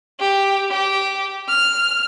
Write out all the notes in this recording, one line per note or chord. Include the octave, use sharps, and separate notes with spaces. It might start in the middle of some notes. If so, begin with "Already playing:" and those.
G4
G4
F6